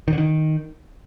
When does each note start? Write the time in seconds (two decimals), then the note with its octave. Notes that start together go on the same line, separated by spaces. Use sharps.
0.08 D#3
0.13 D3
0.18 D#3